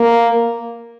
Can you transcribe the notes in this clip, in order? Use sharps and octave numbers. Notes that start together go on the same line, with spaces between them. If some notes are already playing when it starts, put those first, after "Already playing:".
Already playing: A#3